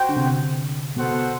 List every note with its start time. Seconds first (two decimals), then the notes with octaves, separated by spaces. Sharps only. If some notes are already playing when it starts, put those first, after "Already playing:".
Already playing: F#4 C5 G5
0.09 D3
0.17 C3
0.96 B2 B3 F#4 A4 C5 F#5